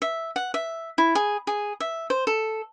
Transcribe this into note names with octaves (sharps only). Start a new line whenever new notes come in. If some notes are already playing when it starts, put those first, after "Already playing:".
E5
F#5
E5
E4
G#4
G#4
E5
C5
A4